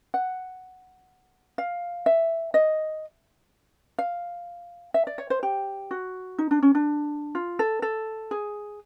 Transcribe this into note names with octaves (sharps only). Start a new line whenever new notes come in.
F#5
F5
E5
D#5
F5
E5
D5
C#5
C5
G4
F#4
D#4
D4
C#4
D4
F4
A4
A4
G#4